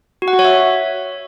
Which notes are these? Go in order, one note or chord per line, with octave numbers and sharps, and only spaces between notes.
F#4
F#5
F#4
C#5
E5